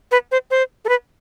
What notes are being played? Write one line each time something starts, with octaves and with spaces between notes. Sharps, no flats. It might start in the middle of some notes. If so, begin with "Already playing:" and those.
B4
C5
C5
A4
B4